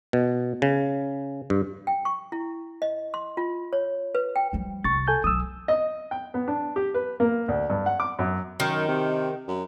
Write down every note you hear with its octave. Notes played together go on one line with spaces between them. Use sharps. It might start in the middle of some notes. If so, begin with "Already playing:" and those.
B2
C#3
G2
G5
C#6
E4
D#5
C6
F4
C#5
B4
G5
F3 G3
C2 C3 C#6 A6
A4 G#5 G6
B1 F#3 D#6 E6
D#5
G5
B3
D4
G4
B4
A#3
D2
G2
F#5
D6
F#2
F#2 D#3
C3
F#2